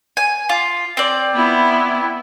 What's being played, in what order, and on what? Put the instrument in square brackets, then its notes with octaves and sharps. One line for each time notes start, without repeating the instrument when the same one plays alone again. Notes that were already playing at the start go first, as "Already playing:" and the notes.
[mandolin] G#5
F4
C4 D5
[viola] B3 E4